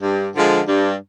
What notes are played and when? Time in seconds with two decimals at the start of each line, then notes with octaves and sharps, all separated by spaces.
0.02 G2
0.35 D3 F3 G#3
0.68 G2